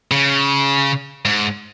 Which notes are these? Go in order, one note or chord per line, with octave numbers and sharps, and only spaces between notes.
C#3
G#2